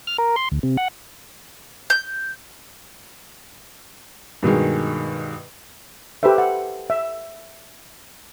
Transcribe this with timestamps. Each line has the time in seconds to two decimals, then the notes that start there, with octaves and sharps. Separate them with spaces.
0.07 F6
0.18 A#4
0.36 C6
0.52 D2
0.63 C3
0.77 F#5
1.90 G6
4.43 G2 B2 D#3 G#3
6.23 G4 A4 B4 C5 E5
6.38 F#5
6.90 E5